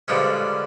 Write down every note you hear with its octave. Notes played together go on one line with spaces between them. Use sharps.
G2 D3 F3 G#3 C#4